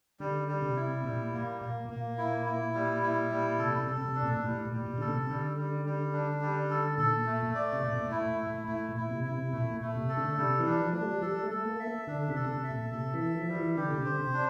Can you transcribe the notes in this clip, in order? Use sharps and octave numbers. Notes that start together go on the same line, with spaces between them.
D3 G3
G3
C3
E4
A#2 G3
A#3
A#2 A#3
A#2 A#3
E4
E4
G3
E4
G3
C3 A4
C3
A4
C3
D4
A#2
A#2
A2 G3
A#2
G3
A#2
D3 A4
C3
D3 G3
G3
G3
D4
G3
A4
A#2 A4
A3
D5
C3
A#2 A3
A#2
A2
E4
A2
A3
A2
A2 E4
A#2
E4
C3
E4
C3
A#2 A3
A#2
A3
C3
A4
D3
C3 G3
E3
D4
F3
A3 D4
G3
F3
G3 A4
A3
A4
A#3
E5
D3 D4
C3
A4
D3
C3
E5
A#2
C3 A4
E3
E5
F3
G3
E3
D3 G4
C3
D3
C5
C3
D4